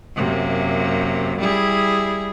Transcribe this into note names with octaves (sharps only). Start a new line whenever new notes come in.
F#2 C3 A#3
G3 E4 G#4